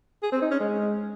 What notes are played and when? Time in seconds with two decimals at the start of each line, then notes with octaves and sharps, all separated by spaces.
0.23 G#4
0.32 C4
0.42 D#4
0.51 C#4
0.61 G#3